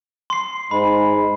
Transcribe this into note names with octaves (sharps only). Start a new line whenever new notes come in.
C6 C7
G#2 G#3 B5